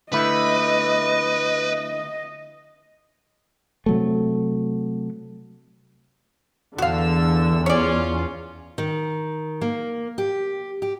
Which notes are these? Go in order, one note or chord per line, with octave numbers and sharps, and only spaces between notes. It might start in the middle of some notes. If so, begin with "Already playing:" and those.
D3 A3 E4 B4 D#5
C3 F#3 A3
E2 D3 F#4 F5 E6
C#4 F4 C#5 D5
D#3
A#3
G4
G4